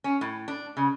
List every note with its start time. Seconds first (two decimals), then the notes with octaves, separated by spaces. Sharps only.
0.04 C#4
0.21 A2
0.48 D4
0.77 C#3